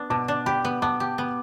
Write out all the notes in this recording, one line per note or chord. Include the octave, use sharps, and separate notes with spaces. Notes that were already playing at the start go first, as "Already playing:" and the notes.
Already playing: B3 D4
B2 A5 D6
D4
G4 G5 B5
B3
B3 A5 D6
G4
B3